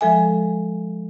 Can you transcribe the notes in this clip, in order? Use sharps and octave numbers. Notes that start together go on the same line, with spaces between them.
F3 G#3 A4 E5 G#5